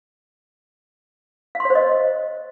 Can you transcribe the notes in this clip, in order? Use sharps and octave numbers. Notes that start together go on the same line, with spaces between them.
F5
C6
C#5
C5
D#5